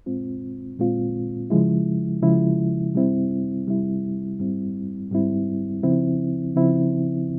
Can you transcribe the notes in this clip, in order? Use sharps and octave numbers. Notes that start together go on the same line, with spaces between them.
A#2 G#3 C4 F4
A#2 G#3 C4 F4
C#3 F3 G#3 E4
C#3 F3 G#3 E4
C3 G3 C4 E4
C3 G3 C4 E4
G#2 G3 C4 E4
G#2 G3 C4 E4
C#3 F3 C4 E4
C#3 F3 C4 E4